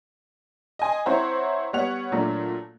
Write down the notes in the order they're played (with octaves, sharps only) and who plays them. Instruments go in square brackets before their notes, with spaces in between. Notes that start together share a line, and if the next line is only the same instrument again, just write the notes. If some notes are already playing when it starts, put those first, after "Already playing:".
[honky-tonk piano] D#5 G#5 C6
C4 E4 C5 C#5 F#5 A#5
G3 B3 C#5 F#5 F7
A#2 F#3 A3 D4